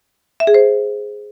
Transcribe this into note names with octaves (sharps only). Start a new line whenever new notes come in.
E5
G#4
C5